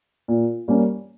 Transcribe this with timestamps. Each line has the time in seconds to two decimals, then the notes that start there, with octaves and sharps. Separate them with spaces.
0.28 A#2
0.68 G3 A#3 C#4